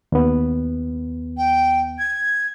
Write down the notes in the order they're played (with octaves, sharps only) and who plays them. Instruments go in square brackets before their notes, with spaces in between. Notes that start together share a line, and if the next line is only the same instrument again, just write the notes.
[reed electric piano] D#2 B3
[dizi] G5
G#6